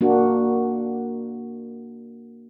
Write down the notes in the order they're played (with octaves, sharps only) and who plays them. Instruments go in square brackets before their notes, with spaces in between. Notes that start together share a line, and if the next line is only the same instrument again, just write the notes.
[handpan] A#3 D4 F#4